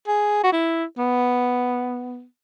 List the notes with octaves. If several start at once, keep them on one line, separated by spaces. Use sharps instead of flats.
G#4
F#4
E4
B3